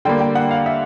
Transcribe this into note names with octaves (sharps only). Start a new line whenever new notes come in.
D3 G3 A#3 G5
G5
F#5
F5
E5